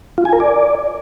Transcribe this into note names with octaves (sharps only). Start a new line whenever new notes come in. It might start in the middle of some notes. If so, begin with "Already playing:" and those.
F4
G#5
A#4
D5